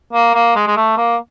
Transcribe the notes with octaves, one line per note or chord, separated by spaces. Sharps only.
A#3
A#3
G#3
G#3
A3
A#3